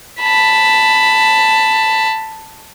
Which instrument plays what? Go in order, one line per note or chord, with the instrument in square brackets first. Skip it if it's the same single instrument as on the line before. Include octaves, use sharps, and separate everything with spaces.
[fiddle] A5 B5